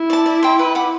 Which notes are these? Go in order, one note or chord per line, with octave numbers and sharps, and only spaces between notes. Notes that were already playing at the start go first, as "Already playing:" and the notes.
Already playing: E4
D5 A5
D5
G5 C6
B4
F#5 B5 D6